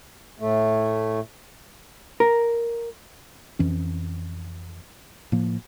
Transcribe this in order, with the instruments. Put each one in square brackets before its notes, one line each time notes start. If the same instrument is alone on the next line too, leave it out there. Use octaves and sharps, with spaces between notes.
[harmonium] A2 A3
[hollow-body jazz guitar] A#4
[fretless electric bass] F2 E3 C#4
A2 F3 A#3